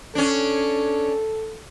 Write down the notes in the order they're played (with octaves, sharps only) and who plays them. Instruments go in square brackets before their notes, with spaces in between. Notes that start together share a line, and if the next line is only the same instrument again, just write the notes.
[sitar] C#4 D4 [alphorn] A4